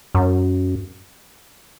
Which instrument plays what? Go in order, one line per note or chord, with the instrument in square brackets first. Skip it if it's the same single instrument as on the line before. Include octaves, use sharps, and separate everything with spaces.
[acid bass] F#2